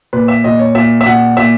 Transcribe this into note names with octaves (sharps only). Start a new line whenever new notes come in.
A#2 B4
E5
A#2 D#5
C#5
A#2 E5
E5
A#2 F#5
A#2 E5